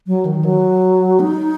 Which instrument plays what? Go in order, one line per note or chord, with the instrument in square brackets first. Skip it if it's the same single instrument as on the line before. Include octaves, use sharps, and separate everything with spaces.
[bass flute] F#3
D#3
F#3
D#4